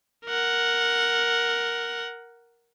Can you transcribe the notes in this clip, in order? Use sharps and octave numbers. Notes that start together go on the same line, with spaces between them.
A#4 F#5